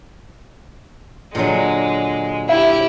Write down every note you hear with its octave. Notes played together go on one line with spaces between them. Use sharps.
A#2 D3 F#3 G#3
E4 G4 E5